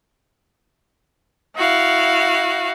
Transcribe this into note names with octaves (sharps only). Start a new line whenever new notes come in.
E4 F#4 F5